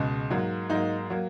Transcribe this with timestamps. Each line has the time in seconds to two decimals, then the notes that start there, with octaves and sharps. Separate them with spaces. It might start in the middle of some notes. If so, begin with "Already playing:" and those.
Already playing: C#2 B2 G#3
0.30 G#2 F#3 A#3
0.69 G#2 F#3 A#3 D#4
1.10 F#3 A#3